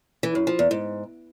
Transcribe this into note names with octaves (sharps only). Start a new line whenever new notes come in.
E3
F#2
F3
E2
G#2